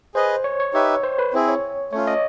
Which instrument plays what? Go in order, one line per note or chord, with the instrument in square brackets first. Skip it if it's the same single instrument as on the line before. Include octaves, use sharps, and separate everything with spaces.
[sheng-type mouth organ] G#4 B4 D#5 [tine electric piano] C5
[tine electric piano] C#5
C#5
[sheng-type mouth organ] D#4 G4 B4 E5 [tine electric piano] C#5
[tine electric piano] C5
B4
[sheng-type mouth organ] C4 E4 G#4
[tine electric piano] C#5
[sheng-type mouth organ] A3 C#4 F4 [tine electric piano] C#5
[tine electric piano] D#5